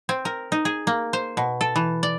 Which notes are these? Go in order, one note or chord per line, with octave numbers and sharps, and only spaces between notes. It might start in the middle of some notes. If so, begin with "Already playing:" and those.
C4
A#4
D#4
G#4
A#3
C5
B2
A4
E3
D5